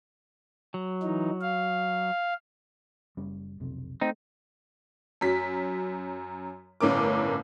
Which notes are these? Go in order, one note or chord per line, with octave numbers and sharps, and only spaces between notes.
F#3
E3 D#4
F5
F#1 G3 C#4
F1 B1 C3
A3 C4 D#4
F#2 F#3 B6
G1 A2 C#4 A#4 D6